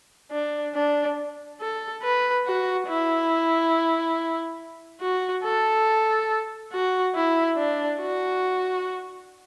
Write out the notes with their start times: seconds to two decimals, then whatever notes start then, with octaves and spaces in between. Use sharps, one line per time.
0.32 D4
0.75 D4
1.61 A4
2.03 B4
2.46 F#4
2.88 E4
5.01 F#4
5.44 A4
6.72 F#4
7.15 E4
7.57 D4
8.00 F#4